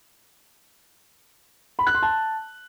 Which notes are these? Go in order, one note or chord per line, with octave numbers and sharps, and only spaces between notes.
B5
F#6
C6
A5